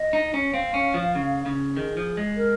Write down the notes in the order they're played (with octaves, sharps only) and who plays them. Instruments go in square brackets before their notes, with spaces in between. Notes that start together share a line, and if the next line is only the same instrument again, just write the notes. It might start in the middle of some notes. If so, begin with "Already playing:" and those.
Already playing: [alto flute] D#5
[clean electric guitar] D#4
C#4
[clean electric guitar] C4 [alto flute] F5
[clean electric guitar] C#4
F3
C#3
C#3
[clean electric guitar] D#3 [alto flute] G#4
[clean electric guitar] F3
G#3
[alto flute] A#4